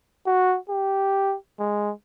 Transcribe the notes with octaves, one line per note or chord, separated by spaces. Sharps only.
F#4
G4
G#3